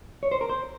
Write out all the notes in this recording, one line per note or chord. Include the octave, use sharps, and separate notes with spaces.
C#5
C5
A#4
C5